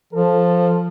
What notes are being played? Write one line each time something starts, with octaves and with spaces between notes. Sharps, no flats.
F3 A4